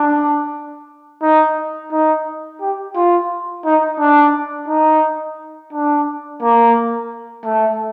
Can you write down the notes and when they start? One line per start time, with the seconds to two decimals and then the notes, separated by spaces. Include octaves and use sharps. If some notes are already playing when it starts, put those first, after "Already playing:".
Already playing: D4
1.22 D#4
1.92 D#4
2.61 G4
2.95 F4
3.65 D#4
3.99 D4
4.68 D#4
5.73 D4
6.41 A#3
7.45 A3